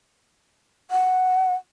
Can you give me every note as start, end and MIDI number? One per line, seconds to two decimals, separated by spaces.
0.91 1.55 78